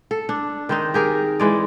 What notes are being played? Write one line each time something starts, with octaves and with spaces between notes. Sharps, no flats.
A4
D4
D#3 C4 D#4
G4 G#4 A#4
E3 G#3 D5